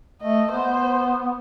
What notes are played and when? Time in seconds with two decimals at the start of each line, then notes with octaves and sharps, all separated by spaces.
0.22 A3 D#5
0.51 B3 C5